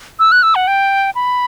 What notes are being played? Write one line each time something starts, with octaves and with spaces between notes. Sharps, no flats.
E6
F#6
E6
F#5
G5
B5